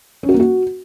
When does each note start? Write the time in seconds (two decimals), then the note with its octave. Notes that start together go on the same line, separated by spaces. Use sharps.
0.23 C#4
0.29 F#4
0.34 A#3
0.40 F#4